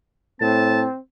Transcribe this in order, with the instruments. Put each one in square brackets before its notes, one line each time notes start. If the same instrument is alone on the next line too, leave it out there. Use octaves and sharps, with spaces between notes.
[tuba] A2 [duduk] C4 [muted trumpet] A5